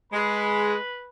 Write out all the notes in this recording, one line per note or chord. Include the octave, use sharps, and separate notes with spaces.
G#3 B4 B5